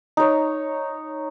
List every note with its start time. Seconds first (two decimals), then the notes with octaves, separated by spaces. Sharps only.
0.17 D#4 C#5